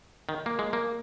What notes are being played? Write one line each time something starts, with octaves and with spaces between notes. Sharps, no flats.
D#3
A#3
G#3
A#3